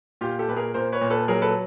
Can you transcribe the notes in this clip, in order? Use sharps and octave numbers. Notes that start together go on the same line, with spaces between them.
A#2 F4 G4
G4 A4
A#2 B4
G#4 A#4
A#2 A#4 C5
B4 C#5
A#2
A4 B4
F#3 G#4 A#4
A4 B4